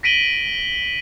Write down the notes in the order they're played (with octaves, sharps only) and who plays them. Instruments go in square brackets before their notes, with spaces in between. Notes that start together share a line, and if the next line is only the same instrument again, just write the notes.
[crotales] A#6 B6 D7 D#7 F#7 G7